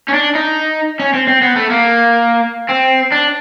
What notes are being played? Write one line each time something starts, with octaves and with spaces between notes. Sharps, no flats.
C#4
D4
D#4
C#4
C4
C4
B3
A3
A#3
C4
D4